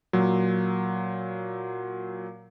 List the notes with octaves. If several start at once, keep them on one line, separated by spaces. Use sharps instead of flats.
A#2 F#3